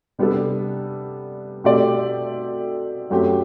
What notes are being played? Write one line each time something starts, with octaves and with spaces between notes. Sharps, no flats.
C3 G3 B3 D4 A4
B2 A3 C4 G4 D5
F#2 F#3 A3 C4 G4